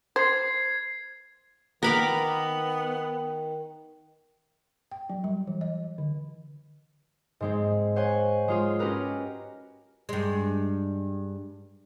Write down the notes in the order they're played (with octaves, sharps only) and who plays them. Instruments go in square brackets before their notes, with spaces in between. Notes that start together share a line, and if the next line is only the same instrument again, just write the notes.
[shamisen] C5 [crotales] G#6 C7
[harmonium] D#3 [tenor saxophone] B3 [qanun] A#4 B5 D6
[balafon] G5
F#3
G3
E3
D#5
D3
[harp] G#2 G#3 C4
C5 C#5 F#5 G#5
G#3 F4 G#4
C#4 F#4 G4 A#4 B4
[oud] G2 G#3